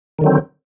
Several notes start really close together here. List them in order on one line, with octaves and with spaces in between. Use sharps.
D#3 D3 F#3 C4